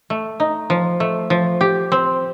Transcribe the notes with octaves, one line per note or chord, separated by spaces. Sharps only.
A3
D#4
F3
A3
F3
G4
C4